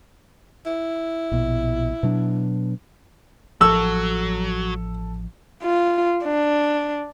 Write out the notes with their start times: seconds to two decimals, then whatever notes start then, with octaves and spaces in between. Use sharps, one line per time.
0.66 E4
1.32 A#1 B2
2.03 B2 F#3 D4
3.61 A1 F3 F#3 A4 E6
5.63 F4
6.24 D4